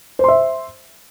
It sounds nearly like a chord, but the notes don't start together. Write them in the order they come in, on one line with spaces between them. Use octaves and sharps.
C5 C6 E5